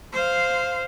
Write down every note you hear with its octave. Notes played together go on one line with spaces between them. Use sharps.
C5 F5